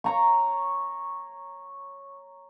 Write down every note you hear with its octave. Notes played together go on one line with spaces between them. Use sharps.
C#5 A#5 C#6